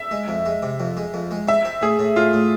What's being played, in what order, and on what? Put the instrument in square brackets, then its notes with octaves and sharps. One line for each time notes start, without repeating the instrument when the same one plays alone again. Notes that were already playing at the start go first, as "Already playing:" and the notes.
Already playing: [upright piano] E5
[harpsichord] G#3
F2
G#3
C3
F2
G#3
F2
G#3
[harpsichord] C4 [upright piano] E5
[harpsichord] C4
[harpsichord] A2 [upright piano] G#4
[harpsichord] A2
[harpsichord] A2 [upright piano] F4
[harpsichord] A2